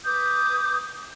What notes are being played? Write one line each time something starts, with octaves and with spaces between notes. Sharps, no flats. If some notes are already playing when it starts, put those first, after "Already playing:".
B4 D6 D#6 G6